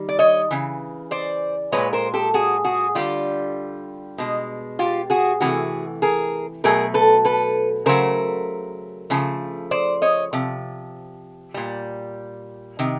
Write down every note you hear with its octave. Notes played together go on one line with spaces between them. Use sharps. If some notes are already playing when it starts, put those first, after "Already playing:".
Already playing: D#3 G3
D5
C#5 D#5
C#3 E3
C5 D5
A#2 F3 G#3 B4 C#5
A#4 C5
G4 A4
F#4 G#4
F#4 G#4
D3 G3 F4 G4
B2 G#3
F4 G4
F#4 G#4
C3 E3 A3 F#4 G#4
G#4 A#4
B2 F#3 A3 G#4 A#4
A4 B4
A4 B4
C#3 F#3 A3 A#4 C5
C#3 F3 A3
C5 D5
C#5 D#5
C3 F3
A#2 G3
C3 D#3